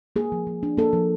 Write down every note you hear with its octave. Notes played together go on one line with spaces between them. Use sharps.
A#3 G#4
F3
F3
D4
A#3 A4
F3